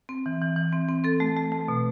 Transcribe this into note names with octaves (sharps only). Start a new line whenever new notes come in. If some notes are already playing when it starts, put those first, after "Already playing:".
C4
E3
E3
E3
C4
C4
C4 A4
A3
A3
A3
B2